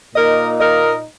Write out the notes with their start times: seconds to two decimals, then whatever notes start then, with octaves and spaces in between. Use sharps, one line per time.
0.14 A#2 A#3 D#4 A#4 D#5
0.60 A#4 D#5